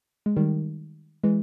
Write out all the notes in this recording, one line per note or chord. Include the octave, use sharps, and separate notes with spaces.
G#3
D#3 G3
E3 G#3